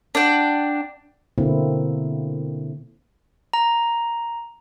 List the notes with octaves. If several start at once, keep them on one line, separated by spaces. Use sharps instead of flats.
D4 F#5 G5
B2 D3 A#3 C4 E4
A#5